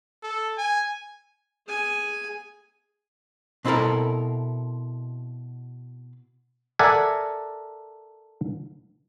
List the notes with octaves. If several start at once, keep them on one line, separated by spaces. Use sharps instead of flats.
A4
G#5
G#4 G#5
B2 C4 E4 F4 A4 A#4
A4 A#4 D5 E5 F#5 G#5